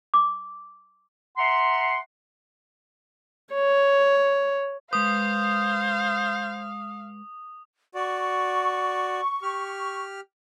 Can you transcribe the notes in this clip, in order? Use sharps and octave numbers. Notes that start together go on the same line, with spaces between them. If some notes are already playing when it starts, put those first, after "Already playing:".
D6
E5 F#5 A#5 C6
C#5
G#3 B4 C5 F5 D#6
F#4 D5 C#6
G4 F6